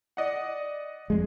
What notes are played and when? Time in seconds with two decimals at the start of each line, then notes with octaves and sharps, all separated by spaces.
0.17 D5 D#5 F#5
1.10 F2 G#3